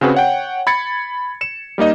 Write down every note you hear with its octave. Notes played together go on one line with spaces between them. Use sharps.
C#3 C4 F#4 G#4 B4
C#5 F#5 G5
B5 G#6 A6 C#7
C#7 E7
G3 A#3 D#4 D#5